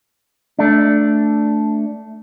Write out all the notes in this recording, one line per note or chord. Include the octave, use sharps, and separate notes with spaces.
A3 D4